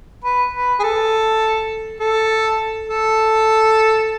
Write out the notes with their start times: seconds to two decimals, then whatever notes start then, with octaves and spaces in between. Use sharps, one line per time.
0.24 B4
0.53 B4
0.80 G#4
0.83 A4
2.00 A4
2.88 A4